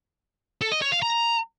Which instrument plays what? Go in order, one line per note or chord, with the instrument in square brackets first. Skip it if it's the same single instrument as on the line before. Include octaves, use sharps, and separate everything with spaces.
[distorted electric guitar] A4
D#5
C#5
F5
A#5